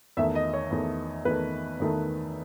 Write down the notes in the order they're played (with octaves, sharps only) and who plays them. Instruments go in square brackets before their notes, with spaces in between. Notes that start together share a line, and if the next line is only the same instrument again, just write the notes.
[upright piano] E2 D#3 A3 E5
D#5
C#5
E2 D#3 A3
E2 D#3 A3 B4
E2 D#3 A3